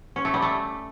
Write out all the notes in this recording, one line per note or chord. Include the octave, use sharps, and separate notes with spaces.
C#4
A3
G3
A3